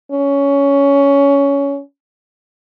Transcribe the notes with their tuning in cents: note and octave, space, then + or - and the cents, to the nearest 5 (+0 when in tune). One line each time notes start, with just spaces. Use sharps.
C#4 +15